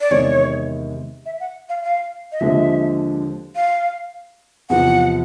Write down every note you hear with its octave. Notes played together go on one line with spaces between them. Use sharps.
D5
E2 C3 D#3 G#3 C#5
E5
F#5
F5
F5
D#5
D#2 D3 F3 G#3 C4 E5
F5
E2 C3 F3 F#5